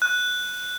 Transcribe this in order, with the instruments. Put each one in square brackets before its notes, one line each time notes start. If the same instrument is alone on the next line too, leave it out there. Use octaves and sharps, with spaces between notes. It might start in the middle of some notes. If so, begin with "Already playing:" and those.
[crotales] F#6